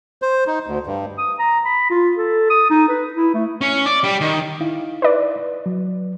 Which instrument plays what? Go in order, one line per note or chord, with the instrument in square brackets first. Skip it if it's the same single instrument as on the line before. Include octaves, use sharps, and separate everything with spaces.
[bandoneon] C5
D#4
D2
G2
[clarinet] D#6
A#5
B5
F4
A4
D#6
D#4
B4
E4
A3
[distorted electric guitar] C#4
D5
G3
D#3
[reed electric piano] D#4 E4 F5
[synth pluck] B4 D5
[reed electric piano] F#3